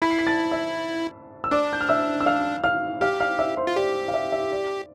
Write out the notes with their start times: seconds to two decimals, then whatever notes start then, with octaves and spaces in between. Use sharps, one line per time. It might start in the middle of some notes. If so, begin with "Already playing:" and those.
0.02 E4 B5 B6
0.10 C7
0.19 B6
0.27 A5 A6
0.51 E5 E6
1.44 E6
1.51 D4 D5 D6
1.73 G6
1.81 F6
1.89 E5 E6
2.20 E6
2.26 F5 F6
2.64 F5 F6
3.01 G4 F5 F6
3.20 F5 F6
3.39 E5 E6
3.57 C5 C6
3.67 F4
3.76 G4 D5
4.08 F5
4.14 E5
4.32 E5
4.52 D5